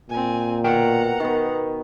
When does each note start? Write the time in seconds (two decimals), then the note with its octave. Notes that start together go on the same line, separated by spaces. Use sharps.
0.10 A#2 C4 G#5
0.64 B2 A#4 F#5 G5 A#5
1.20 D#3 B3